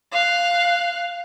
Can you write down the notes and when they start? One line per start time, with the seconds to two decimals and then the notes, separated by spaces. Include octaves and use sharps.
0.12 F5 F#6